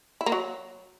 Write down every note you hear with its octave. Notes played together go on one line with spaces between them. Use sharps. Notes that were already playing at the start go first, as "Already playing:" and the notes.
E4
A#3
F#3